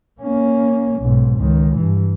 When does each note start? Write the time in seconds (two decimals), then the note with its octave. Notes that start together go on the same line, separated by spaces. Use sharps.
0.21 A#3 C#4
0.99 B1 G#2
1.38 C#2 D#3
1.76 G2 E3